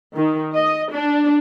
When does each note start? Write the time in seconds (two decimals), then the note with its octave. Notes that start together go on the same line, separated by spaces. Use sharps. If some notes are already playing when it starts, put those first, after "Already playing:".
0.16 D#3
0.56 D#5
0.94 D4